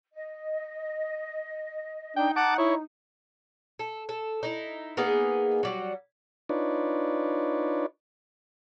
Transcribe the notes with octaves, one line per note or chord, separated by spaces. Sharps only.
D#5
D4 D#4 G5
F#5 A5 D6
E4 C#5
A4
A4
D#4 E4
A#3 B3 D#4 G#4
F#3 G3 F#4
D4 D#4 F4 B4 C#5 D5